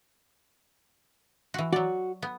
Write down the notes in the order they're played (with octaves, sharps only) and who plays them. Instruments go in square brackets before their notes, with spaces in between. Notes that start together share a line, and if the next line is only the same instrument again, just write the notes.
[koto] E3 F#4
[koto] F#3 D5 [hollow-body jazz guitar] F#4
[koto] B3